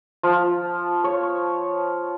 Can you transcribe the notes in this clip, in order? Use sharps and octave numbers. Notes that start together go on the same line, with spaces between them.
F3
C#5